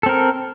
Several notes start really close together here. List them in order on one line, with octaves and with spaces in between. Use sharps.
A4 C4 A#4